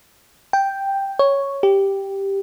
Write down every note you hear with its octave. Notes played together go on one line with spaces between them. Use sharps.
G5
C#5
G4